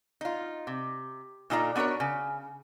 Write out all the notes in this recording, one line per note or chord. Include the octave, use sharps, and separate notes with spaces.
D#4 F4
C3
A#2 D4 D#4 F4 A4 A#5
B3 D4 F#4 A#4 C#5
C#3